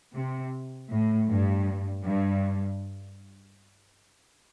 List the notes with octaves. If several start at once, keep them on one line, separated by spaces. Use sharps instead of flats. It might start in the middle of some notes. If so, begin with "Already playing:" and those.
C3
A2
G2
G2